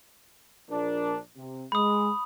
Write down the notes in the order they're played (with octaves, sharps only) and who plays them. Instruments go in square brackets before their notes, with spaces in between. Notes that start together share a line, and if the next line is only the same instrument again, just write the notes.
[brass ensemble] A#1 D4 A#4
C3
[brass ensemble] G#3 [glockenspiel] B5 D#6